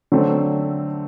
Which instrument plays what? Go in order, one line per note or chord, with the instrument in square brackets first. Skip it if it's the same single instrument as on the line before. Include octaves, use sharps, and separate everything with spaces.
[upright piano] D3 F#3 A3 C4